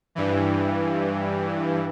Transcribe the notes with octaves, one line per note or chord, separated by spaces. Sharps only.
G2 E3